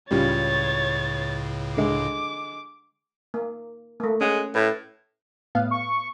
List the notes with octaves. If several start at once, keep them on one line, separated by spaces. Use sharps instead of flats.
C#2 A2 C#3 G3 C#4 F4 C#5 A6
D3 G#3 D6
A#3
A3 A#3
G#3 C#4 F#5
A2 B4
A2 B3 F5
C#6